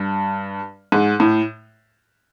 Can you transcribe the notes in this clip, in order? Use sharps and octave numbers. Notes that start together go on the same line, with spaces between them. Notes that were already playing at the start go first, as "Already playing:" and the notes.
Already playing: G2
G#2
A2